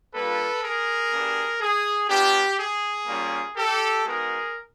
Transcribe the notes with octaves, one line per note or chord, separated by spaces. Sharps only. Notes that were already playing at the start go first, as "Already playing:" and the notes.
G3 A#3 D4 F4 A4 B4
G#4 A#4
B3 D4 G4
G#4
B3 D4 F4 G4
G#4
G3 A#3 C#4 F4
G4 A4
G#3 B3 D#4 F#4 G#4 A#4